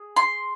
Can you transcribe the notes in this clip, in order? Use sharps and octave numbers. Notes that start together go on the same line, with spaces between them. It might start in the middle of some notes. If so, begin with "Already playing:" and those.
Already playing: G#4
C6